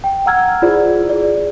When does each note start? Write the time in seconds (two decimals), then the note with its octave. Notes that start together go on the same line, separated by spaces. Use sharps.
0.04 G5
0.26 F#5 A#5 E6 F6 G#6
0.62 E4 F4 G#4 C5 D5
1.09 G#4 D5